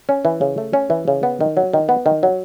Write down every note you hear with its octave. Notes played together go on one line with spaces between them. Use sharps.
C#4
E3
C#3
A3
C#4
E3
C#3
B3
D#3
F#3
D#3
B3
D#3
F#3